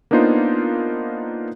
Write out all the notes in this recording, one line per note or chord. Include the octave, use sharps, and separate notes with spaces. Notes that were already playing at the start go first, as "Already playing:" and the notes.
A#3 B3 D4 D#4 F4 C5